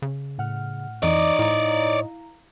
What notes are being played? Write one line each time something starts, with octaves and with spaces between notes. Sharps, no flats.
C#3
A2 F#5 F6
F2 E3 D#4 C#5 D5
A2 E4 F5 A#5